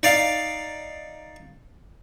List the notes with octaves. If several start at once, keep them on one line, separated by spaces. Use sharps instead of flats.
D#4 D5 F5